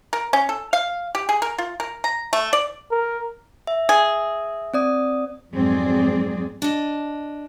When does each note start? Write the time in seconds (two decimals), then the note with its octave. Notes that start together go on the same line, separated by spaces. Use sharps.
0.13 A#4
0.33 C#4
0.49 A4
0.73 F5
1.15 G4
1.29 G#4
1.42 A#4
1.58 F4
1.80 A#4
2.04 A#5
2.33 A3
2.53 D5
2.91 A#4
3.67 E5
3.89 G#4
4.74 C4 D5 D#6
5.55 F2 G#2 F#3 C4 G#4 D5
6.62 D4 D#5